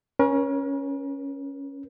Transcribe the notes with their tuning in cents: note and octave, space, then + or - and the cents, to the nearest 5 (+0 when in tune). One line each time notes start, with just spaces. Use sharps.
C#4 +0 A#4 +45